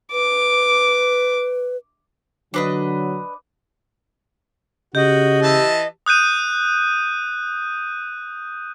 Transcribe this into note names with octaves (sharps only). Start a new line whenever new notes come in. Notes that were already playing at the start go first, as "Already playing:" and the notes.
B4 D6
D3 F#3 D4 B4 D#5
C#3 F#4 G4 D#5
E3 A5 E6
D#6 F#6 G6 D#7